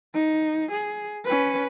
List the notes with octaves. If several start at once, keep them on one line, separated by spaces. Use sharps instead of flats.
D#4
G#4
C#4 B4